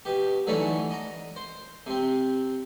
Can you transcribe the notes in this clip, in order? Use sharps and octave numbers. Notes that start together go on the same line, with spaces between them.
B2 G4
D3 E3 F#3 A3 C#4 D#4
D#5 A#5
C5
C3 C4